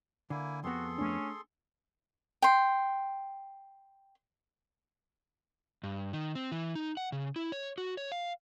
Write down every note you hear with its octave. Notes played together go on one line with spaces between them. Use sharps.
D3 A#3 E4 G#5
F2 B3 F#4 G#4 A4 C6
A3 C#4 D4
G5 C6
G2
D#3
C4
E3
D#4
F#5
C#3
E4
C#5
F#4
C#5
F5